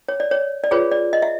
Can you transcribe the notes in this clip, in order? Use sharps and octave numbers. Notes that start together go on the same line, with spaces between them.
C#5
D5
C#5
D5
F4 G#4 B4 C#5
D5
D#5
E5